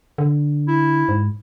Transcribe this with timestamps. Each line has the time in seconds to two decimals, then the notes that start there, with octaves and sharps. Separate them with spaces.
0.18 D3
0.68 E4
1.09 G#2